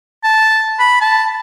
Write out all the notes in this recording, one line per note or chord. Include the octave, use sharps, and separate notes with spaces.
A5
B5
A5